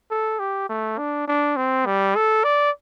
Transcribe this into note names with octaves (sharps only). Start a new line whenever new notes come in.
A4
G4
A3
D4
D4
C4
G3
A4
D5